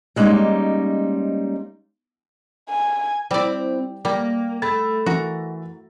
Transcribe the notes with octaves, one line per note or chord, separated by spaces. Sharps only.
G3 G#3 A#3 C#4 D#4
G#5
G3 C4 E4 D5
G3 A#3
A3 B5 A6
E3 F#4 A#4